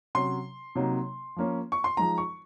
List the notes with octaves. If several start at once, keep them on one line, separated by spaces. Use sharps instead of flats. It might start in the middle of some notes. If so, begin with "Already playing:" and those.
C3 F#3 C#4 C6
C3 F#3 A#3 D#4
F3 A#3 C#4
C#6
C6
F3 G#3 D#4 A#5
C#6